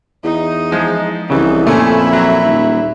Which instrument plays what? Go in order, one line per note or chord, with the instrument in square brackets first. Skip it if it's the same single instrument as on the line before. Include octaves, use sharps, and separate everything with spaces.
[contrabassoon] E2 [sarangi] D#4
[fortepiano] F3 [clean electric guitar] G#3
[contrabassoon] C2 [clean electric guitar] C#3 E3 [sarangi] D#4
[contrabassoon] F2 [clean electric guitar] A#2 [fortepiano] A3 C#4 [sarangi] E4
[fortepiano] F#3
[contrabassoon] D#1